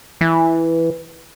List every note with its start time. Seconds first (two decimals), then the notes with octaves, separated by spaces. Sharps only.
0.21 E3